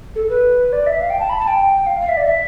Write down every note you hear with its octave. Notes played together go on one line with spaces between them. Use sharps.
A4
B4
D5
E5
F5
G5
A5
B5
A5
G5
F5
F5
E5
D5
E5